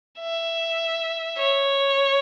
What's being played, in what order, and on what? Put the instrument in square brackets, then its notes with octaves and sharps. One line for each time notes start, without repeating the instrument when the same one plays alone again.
[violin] E5
C#5